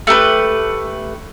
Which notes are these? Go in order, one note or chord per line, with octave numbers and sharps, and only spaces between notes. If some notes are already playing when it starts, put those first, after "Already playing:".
A3 G4 A4 B4